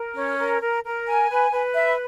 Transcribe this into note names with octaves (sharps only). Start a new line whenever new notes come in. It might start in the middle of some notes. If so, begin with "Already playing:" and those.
Already playing: A#4
C#4
A#4
A#4
A#4
G#5
B4
B4
E5